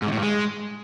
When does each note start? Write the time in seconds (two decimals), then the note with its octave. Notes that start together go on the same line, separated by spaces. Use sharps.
0.02 G#2
0.07 D#3
0.12 A2
0.17 G2
0.22 G#3